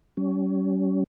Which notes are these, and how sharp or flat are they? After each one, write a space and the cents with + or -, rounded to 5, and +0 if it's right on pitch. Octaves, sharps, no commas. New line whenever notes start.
G3 -40 C#4 +20